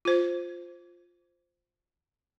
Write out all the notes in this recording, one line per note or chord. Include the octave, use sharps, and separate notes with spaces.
F4 C5